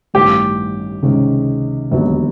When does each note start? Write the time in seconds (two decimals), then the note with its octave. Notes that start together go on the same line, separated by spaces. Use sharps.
0.14 A1 G2 D#3 G3 B3 G4
1.02 C#2 C3 D#3 G#3 C#4
1.91 E1 D#2 D3 F#3 B3